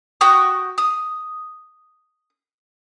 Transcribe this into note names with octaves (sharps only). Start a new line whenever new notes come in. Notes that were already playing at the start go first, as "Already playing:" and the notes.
F#4 G5 C#6 D#6
D#6